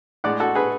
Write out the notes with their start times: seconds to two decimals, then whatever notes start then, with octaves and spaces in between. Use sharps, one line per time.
0.24 A2 G#3 D5 F#5
0.40 F#4 A4
0.55 G#4 B4